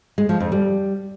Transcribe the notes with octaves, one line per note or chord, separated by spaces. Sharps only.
G#3
F3
F2
G3